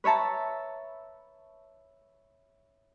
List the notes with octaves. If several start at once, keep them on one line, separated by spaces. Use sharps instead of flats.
B4 C#5 E5 A5 A#5